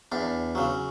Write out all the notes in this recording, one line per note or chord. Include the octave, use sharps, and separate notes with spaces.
E2 D4
C#3 F#3